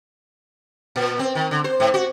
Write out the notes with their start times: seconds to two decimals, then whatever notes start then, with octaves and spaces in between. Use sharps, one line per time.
0.96 A#2
1.19 C4
1.35 D#3
1.51 D3
1.64 C5
1.80 G#2
1.94 F#4